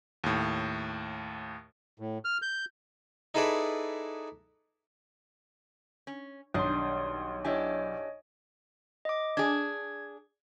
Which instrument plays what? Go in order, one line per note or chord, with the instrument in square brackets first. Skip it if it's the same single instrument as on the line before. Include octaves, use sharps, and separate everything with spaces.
[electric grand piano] D#2 A2
[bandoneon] A2
F6
G6
[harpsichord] D#4 E4 G#4 A4 B4 D5
[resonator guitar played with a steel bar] C#4
[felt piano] B1 [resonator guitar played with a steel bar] D#3 G3 D4 [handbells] C6 D#6
[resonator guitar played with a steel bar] D4 E4 G4 [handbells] C#5 D#5 G#5
[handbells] D#5 D6
[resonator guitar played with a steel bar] D4 G#4 [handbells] G#6